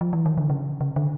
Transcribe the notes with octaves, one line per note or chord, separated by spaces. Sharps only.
F3
E3
D#3
D3
C#3
C#3
D3